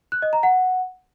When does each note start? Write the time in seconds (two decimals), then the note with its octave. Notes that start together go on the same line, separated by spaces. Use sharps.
0.12 F#6
0.22 D#5
0.33 A#5
0.43 F#5